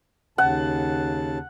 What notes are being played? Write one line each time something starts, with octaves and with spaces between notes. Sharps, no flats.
D#2 C#3 F#5 A5